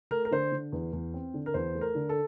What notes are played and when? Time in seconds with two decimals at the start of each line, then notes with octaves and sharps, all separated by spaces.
0.11 A3 A#4
0.25 A#4
0.31 D3 C5
0.52 D3
0.72 E2
0.93 E2
1.14 C4
1.34 D3
1.46 A#4
1.54 E2 C5
1.75 A3
1.81 A#4
1.95 D3
2.09 A4